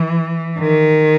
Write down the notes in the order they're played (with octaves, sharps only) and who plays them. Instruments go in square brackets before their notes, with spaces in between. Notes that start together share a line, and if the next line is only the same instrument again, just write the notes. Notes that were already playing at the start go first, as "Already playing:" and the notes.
Already playing: [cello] E3
D#3